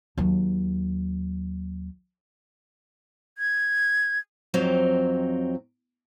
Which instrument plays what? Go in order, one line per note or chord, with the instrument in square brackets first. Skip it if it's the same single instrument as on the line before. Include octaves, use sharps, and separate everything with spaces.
[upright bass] D#2 F#3
[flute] G#6
[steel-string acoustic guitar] F2 F#3 C4 D#4